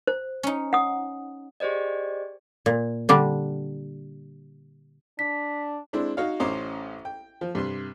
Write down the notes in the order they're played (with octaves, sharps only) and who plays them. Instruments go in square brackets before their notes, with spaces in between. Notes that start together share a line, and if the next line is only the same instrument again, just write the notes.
[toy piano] C5
[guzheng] C#4 D#4
[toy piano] F#5 D#6
[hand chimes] G4 G#4 C5 D5 D#5
[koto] A#2
D3 G3 D4
[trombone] D4 [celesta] B6
[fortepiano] G#3 C4 D4 E4
D#4 F#4 C#5 F5
A1 C#4 C5 D#5 A#5 D6
G5
F3
G2 C3 C6